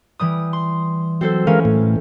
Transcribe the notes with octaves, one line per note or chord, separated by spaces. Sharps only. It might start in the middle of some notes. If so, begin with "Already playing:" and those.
E3 G3 D#6
C6
F#3 C4 A4 C5
E3 G#3 C#4 A#4 F5
A2 A3